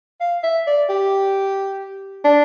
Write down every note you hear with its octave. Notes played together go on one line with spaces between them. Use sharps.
F5
E5
D5
G4
D4